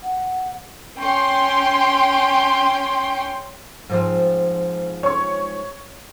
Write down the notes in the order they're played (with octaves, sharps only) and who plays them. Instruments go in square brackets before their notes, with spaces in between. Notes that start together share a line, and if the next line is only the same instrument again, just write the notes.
[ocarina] F#5
[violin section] C#4 G5 C6
[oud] G#2 F3 C4
[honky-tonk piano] C#5 C#6